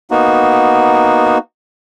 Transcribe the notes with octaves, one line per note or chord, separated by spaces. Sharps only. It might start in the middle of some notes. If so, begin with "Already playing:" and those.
A#3 B3 D#4 F#4